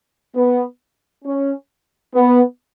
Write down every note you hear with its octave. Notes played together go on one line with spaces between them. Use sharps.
B3
C#4
B3